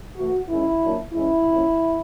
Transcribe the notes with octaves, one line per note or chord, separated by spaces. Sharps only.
C3 E3 A3 F#4
D#3 G#3 C#4 E4
A#2 F#3 A#3 D4
E3 G#3 C#4 E4
C3 F3 A#3 C#4